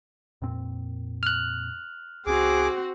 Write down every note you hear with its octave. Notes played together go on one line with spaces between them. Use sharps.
F2 A#2 C4
F6 F#6
C#2 C4 F#4 G#4 D6